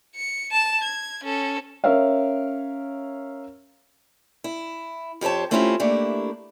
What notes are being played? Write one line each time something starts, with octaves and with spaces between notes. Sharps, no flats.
C#7
A5 E7
G#6
C#4 A4
C#4 A#4 C#5 E5 F5
E4
F2 G4 C5 C#5 A5
A3 C4 C#4 E4 F4 G4
A3 A#3 D4 E4 G4